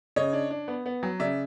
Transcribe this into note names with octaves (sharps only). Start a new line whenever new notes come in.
C#3 C#5 D#5
D4
D4
B3
B3
F#3
C#3 D5 E5